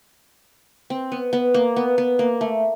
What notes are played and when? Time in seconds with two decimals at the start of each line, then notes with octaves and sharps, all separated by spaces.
0.90 C4
1.12 B3
1.33 B3
1.54 A#3
1.76 B3
1.98 B3
2.19 A#3
2.41 A3